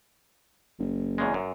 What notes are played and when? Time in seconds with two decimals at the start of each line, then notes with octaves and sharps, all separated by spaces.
0.79 F#1
1.18 E2 C#3 G#3
1.34 F#2